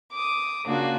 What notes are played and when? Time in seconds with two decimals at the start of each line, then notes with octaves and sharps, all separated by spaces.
0.12 D6 D#6
0.66 C#3 A#3 D4 F4 F#4